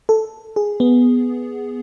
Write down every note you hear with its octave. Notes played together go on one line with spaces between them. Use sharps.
A4
G#4
B3